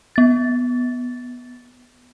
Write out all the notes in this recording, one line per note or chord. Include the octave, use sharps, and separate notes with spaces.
B3 A6